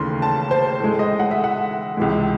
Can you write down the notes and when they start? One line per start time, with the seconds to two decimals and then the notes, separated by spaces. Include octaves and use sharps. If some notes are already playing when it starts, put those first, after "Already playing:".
Already playing: D#2 C#3 E3 A3 C6
0.22 A5
0.51 C5
0.80 A2 G#3
0.99 D#5
1.20 F#5
1.31 E5
1.44 F#5
1.97 C#2 C3 E3 G#3